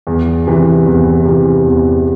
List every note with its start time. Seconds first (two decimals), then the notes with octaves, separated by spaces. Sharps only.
0.07 E2
0.47 C3 E3
0.86 E2
1.25 C3 E3
1.65 E2